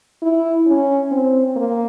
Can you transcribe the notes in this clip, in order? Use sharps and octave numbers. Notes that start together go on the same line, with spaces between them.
E4
C#4
C4
A#3